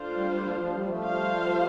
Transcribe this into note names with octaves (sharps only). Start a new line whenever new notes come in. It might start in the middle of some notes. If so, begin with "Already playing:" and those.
Already playing: A3 D4 F4 C5 F5
G3
G3
F3
F3
G3
F3 A3
G3 F4 C5 F5